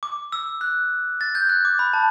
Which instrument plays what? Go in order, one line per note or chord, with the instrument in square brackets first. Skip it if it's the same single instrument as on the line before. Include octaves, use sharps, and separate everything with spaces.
[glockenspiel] D6
E6
F#6
A6
G6
F#6
D6
B5
A5